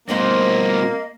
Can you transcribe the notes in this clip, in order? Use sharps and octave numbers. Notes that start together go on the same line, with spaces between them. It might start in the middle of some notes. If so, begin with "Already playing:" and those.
G2 B2 A#3 C4 F#4 C5 D#5